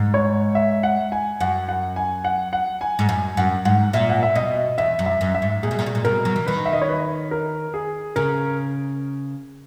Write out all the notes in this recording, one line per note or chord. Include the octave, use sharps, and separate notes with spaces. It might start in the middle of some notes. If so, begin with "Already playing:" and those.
Already playing: G#2
C#5
E5
F#5
G#5
F#2 F#5
F#5
G#5
F#5
F#5
G#5
G#2
F#2 G#5
F#2 F#5
G#2 F#5
A#2 E5
F#5
E5
B2 D#5
E2 E5
F#2
E5
F#2
E5
G#2
A#2 G#4
B2
A#2
B2
A#2
B2 A#4
F#3
E3
D#3 B4
E5
D#5
C#5
B4
A#4
G#4
C#3 A#4